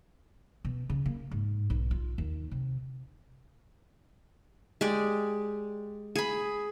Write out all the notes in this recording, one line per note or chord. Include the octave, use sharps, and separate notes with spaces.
B2
C#3
A#3
G#2
B1
F4
D#2
C3
G#3 G4 D5
G#4 B5